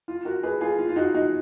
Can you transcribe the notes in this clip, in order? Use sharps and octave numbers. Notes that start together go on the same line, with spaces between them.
F4
F#4 A#4
G#4 B4
F4 G#4
F4
F4
D#4 F#4
D#4 F#4